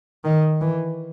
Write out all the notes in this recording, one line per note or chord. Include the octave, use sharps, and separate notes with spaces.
D#3
E3